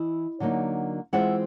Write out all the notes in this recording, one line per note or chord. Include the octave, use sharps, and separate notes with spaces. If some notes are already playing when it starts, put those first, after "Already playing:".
Already playing: E3 E4 D#5
D3 F#3 A#3 D#4
E3 G#3 C4 F4 E5 F#5